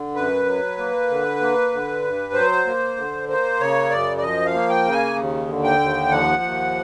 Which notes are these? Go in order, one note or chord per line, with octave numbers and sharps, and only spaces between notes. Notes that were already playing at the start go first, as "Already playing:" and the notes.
Already playing: D3
F#2 B4
F#3
A#3
D3
A#3
D3
G2
F#3 C5
A#3
D3
A#3 C5
C#3 C#5
F#2 D5
D5
F3 D#5
F5
A#3
G5
C#3
G#5
D#2
D3
G5
D#2
F3 F#5
D#2